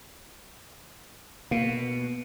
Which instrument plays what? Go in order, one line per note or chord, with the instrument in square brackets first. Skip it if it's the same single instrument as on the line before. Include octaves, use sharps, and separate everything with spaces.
[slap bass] B2 [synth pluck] A#3